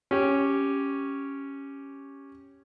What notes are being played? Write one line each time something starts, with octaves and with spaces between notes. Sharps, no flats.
C#4 G4